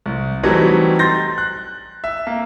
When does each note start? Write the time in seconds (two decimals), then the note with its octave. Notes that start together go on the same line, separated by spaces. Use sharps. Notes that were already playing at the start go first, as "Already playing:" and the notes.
0.06 C2
0.43 E3 F#3 G3 A3 C4 D#4
0.99 C6 G6 A6 A#6
1.38 F#6
2.04 E5
2.27 A#3